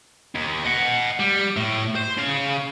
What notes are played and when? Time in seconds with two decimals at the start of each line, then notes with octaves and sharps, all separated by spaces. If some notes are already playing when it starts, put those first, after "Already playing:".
0.35 D#2
0.65 D#5 F#5
1.20 G3
1.57 A2
1.95 C5
2.17 C#3 F5